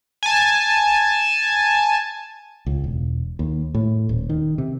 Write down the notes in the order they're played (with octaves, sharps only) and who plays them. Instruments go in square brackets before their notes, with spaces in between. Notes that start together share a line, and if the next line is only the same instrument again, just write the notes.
[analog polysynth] G#5 A5
[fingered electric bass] C#2
E1
D#2
A2
D#1
D#3
C3